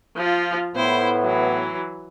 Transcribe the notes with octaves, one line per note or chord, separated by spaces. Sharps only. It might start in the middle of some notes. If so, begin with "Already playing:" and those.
F3 F4
A2 B3 E4 C5
E3 F#3